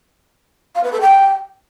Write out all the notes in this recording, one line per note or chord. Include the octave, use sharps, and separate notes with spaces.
F5
B4
A4
G5